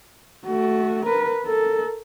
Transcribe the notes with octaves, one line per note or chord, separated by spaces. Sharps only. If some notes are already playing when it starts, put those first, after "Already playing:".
A3 F#4
A#4 B4
A4 A#4